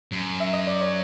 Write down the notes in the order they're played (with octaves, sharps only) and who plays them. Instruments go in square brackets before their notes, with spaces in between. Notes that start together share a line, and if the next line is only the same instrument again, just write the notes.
[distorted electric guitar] F#2
[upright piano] E5
D#5
D5
C#5